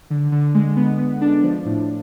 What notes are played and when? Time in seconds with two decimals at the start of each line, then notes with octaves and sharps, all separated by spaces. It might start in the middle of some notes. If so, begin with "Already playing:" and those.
0.10 D3
0.32 D3
0.54 G#3
0.76 B3
0.98 B3
1.21 D4
1.43 F3
1.65 A2